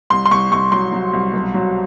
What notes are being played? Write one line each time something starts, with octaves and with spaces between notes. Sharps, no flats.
C2 C6
C6
C2 C#6
C2 C#6
F#3 C6
F#3
C2
B1
F#3